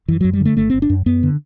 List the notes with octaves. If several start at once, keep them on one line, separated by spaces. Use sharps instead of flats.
F#2 E3
F#2 F#3
G3
D3
A3
G1 A3
G1 C4
D4
F#2
F#2 B3
D3